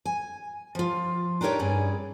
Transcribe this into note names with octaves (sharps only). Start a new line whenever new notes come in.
G#5
F3 F4
D4 D#4 G4 A#4 C#5 D5
G2 C#4 G#4 D5